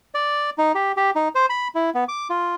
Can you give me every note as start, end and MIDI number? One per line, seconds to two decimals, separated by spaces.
0.15 0.50 74
0.58 0.72 63
0.75 0.92 67
0.97 1.10 67
1.15 1.28 63
1.35 1.46 72
1.50 1.68 83
1.75 1.90 64
1.94 2.04 59
2.09 2.28 86
2.30 2.55 65